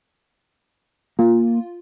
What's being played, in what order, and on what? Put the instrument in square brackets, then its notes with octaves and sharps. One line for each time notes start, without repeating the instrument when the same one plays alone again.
[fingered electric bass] A#3 [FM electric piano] F4